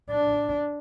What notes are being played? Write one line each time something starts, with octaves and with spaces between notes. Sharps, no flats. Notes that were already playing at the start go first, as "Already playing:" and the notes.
D4